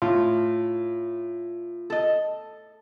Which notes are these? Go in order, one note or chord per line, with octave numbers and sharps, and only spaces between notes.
A2 F4
A4 D#5